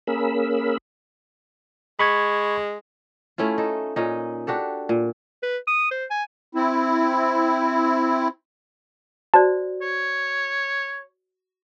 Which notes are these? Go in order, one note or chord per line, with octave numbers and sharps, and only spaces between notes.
A#3 C#4 G#4 A#4 B5 E6
G#3 B5 C#6 G#6
A3 C#4 E4 F4
D#4 A4
A#2 C#4 D#4
D4 F#4 G4 A4
A#2
B4
D#6
C5
G#5
C4 E4
F#4 C5 D5 A5
C#5